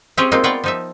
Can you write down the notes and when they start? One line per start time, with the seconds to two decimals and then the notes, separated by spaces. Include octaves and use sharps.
0.17 C4 C#4 F4 G4 G#4 C#5
0.32 G#3 A#3 C4 D#4 F4
0.44 B3 F4 A#4 C#5 D5 G5
0.64 F3 D#4 E5